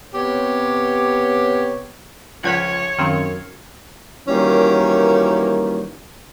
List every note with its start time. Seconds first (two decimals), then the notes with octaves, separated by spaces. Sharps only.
0.13 C3 B3 G4 C#5
2.43 C#2 F3 C#5 F#5 G#6 B6
2.99 F#2 D#3 C4 F5
4.28 D#3 E3 F#3 G3 A#3 C#4